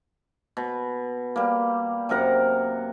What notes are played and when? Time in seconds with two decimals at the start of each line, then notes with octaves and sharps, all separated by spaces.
0.57 B2
1.36 G3 A#3
2.09 F#2 C3 A#4 F#5